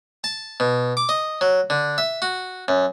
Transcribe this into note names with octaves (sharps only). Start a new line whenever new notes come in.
A5
B2
D6
D#5
F#3
D3
E5
F#4
F#2